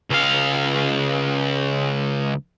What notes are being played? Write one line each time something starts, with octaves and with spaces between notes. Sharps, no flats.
C#2 F5